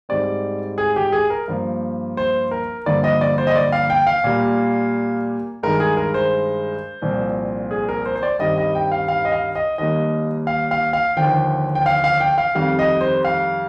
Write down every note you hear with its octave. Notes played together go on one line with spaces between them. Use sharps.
G#2 G3 C4 D5
G#4
G4
G#4
A#4
G2 F3 A#3
C5
A#4
G2 D3 F3 A#3 D5
D#5
D5
C5
D#5
D5
F5
G5
F5
A#2 G3 A#3
G2 D#3 G#3 A#4
G#4
A#4
C5
C2 A#2 F3 C4
G#4
A#4
C5
C5
D5
G2 D#3 G3 C4 D#5
D#5
G5
F5
F5
D#5
F5
D#5
D#2 D#3 G3 A#3 D#5
F5
F5
F5
D#2 D3 F3 G5
G5
F5
F5
G5
F5
F2 D#3 G3 F5
D#5
C5
F5